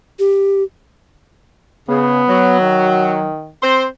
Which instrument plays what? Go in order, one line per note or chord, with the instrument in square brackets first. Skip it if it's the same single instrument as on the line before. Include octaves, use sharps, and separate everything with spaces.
[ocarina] G4
[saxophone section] C#3 [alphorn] B3
[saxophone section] F#3
[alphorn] D#3
[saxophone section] C4 C5